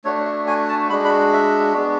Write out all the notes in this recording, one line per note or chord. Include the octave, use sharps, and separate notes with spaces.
A3 D4 F#4 C#5
E5
G#5
A5
G#3 D4 F#4 B5
B5
E5
G#3 B3 D4 F#4